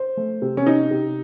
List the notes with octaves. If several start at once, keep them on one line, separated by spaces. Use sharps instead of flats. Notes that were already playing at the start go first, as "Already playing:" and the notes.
Already playing: C5
A3
C3
C#4
C3 D#4
C3